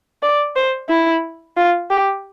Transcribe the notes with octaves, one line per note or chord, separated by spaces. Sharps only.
D5
C5
E4
F4
G4